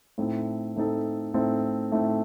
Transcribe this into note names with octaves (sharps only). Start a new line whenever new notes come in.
A2 A3 C4 D#4 A4
A2 A3 C4 D#4 A4
A2 A3 C4 D#4 A4
A2 A3 C4 D#4 A4